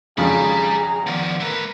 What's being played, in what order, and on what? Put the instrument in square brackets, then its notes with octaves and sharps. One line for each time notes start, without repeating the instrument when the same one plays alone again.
[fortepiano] G#1 F2 C#3 [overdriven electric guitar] G4 B5 [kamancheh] G#4 A#5
[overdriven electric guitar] D#3 F3 [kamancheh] B3 D5
[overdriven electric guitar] A3 B4 [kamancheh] A#4